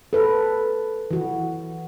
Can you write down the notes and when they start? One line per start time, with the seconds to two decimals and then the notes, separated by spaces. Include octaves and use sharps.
0.13 A4 B4
1.11 E3 F#4